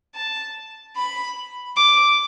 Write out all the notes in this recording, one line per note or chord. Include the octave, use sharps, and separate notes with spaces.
A5
B5
D6